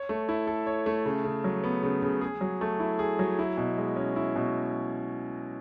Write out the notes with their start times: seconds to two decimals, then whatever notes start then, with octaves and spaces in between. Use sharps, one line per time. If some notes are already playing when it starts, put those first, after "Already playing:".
Already playing: C#5
0.09 A3
0.29 E4
0.47 A4
0.67 C#5
0.86 A3
1.06 C#3
1.24 C#3
1.44 F#3
1.64 B3
1.83 C#3
2.02 C#3
2.21 G#4
2.41 F#3
2.61 A3
2.80 E4
2.99 G#4
3.19 F#3
3.39 E4
3.57 B2
3.78 G#3
3.96 C#4
4.16 E4
4.36 B2